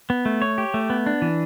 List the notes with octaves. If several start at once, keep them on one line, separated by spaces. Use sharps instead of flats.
B3
A3
C#5
G4
A3
B3
D4
E3